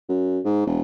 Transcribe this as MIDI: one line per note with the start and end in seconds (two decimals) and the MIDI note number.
0.09 0.40 42
0.45 0.65 44
0.67 0.81 28